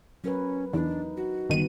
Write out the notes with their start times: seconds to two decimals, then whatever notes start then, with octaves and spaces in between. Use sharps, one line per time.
0.24 F#3 C#4 A#4 B4
0.73 E2 D4 D#4
1.17 F#4
1.49 G1 D#3 G3 B3 D#7